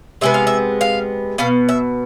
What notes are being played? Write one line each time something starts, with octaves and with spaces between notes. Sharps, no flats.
C3 G#3 B3 E5
F5
E5
F5
B2 B3 F5
E5